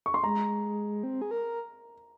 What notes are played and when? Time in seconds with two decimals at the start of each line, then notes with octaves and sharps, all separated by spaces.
0.06 C#6
0.14 C6
0.24 G#3 A#5
1.03 C4
1.22 G#4
1.31 A#4